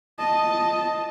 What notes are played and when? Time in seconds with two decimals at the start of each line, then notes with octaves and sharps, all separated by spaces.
0.19 D#5 A5